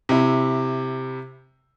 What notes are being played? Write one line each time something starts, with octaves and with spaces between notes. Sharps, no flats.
C3 E4